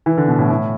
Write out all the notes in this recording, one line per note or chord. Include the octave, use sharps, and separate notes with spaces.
E3
D3
B2
A2
A2